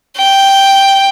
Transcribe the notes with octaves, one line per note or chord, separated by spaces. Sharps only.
G5